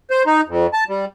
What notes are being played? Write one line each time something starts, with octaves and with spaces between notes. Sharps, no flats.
C5
D#4
F2
A5
G3